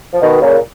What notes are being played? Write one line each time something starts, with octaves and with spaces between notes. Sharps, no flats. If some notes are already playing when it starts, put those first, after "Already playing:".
F3
B2 D#3
A#2 C#3